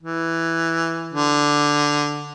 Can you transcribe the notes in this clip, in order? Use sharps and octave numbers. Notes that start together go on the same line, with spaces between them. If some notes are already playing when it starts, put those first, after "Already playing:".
E3
D3